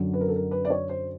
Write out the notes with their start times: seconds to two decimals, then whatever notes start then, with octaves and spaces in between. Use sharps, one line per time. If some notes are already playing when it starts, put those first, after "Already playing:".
Already playing: F#2 D3 F#3
0.14 B4
0.21 A#4
0.28 A4
0.36 A#4
0.51 B4
0.65 D5
0.70 C#5
0.89 C5